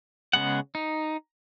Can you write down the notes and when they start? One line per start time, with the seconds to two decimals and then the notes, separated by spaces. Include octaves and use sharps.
0.33 C#3 G#3 B3 F#5
0.75 D#4